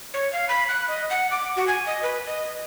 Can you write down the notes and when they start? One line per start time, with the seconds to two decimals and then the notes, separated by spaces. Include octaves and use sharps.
0.14 C#5
0.33 F5
0.49 B5
0.69 F#6
0.88 D#5
1.10 F#5
1.31 D6
1.56 F#4
1.68 G#5
1.86 D#5
2.03 B4
2.26 D#5